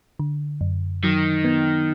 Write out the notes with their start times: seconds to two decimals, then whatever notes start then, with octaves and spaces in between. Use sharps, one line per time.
0.19 D3
0.61 F#2
1.03 D#3 F#3
1.45 B3